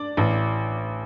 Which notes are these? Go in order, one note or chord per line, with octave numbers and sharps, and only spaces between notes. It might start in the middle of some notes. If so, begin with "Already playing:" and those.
Already playing: D4 D5
A1